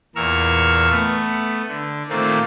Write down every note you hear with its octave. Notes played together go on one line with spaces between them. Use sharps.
E2 A#2 A#4 C#6 E6 F6
A3 B3
D3
A#2 D#3 A3 A#3 C4